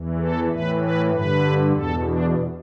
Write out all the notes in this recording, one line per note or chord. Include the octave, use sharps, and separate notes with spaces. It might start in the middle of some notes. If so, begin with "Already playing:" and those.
Already playing: E2 E3
A4
A2 E3 B4
B4
G2 D3 B4
E2 B2 A4
D4